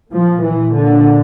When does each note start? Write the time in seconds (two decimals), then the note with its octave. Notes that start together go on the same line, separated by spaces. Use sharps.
0.12 A#2 F3
0.44 E3
0.76 D3